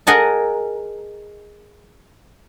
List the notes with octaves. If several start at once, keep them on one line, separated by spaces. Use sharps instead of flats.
G#4 A#4 D#5 F#5 G#5 A5